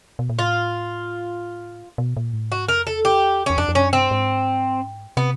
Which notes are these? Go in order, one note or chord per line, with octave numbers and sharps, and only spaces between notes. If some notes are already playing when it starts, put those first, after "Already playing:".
B2
A#2
A2 F4
B2
A#2
A2
G#2 F#4
F2 A#4
E2 A4
G4
E2 C#4
F2 D4
F2
F#2 C#4
G2 C4
G#2
C3 B3